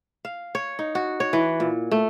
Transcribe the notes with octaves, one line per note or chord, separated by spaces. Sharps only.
F5
C#5
D#4
F#4
C#5
E3
A#2
A3